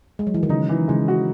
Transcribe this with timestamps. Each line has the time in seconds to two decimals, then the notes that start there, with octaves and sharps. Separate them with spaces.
0.19 G#3
0.27 F#3
0.34 E3
0.43 D#3
0.49 C#3 D#4
0.69 E3
0.88 C#3 G#3
1.08 F#4